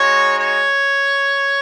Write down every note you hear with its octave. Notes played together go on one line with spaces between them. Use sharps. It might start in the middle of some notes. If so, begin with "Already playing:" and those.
Already playing: G#3 D#4 F#4 C#5
C#5